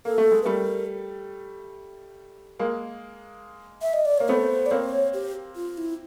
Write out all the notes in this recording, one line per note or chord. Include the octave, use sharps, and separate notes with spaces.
A#3 A4
A3
G#3
B4
G3 A3 A#4
G#3 A#3
E5
D#5
D5
A#3 C#5
A3 B3 C5
D5
A#3 C4 C#5
G4
F4
E4